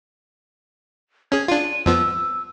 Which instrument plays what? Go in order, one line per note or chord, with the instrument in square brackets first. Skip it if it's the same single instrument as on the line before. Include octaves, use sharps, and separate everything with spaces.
[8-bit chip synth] C#4 G#4 [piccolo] G#6
[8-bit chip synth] D4 F4 [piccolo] D#7
[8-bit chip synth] F2 F3 B3 [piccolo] E6